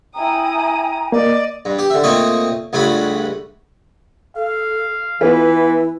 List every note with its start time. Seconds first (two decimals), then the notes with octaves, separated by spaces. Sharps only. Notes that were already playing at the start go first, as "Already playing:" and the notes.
0.15 E4 G5 G#5 A#5 D#6
1.12 A#3 D5 D#5
1.65 G2
1.79 G4
1.90 D3 E5
2.04 A#2 A3 C4 C#5 D#5 C#6
2.73 C#2 G2 A3 C#4 F#5 B5
4.36 A4 F5
5.21 E3 B3 E4 F4 B4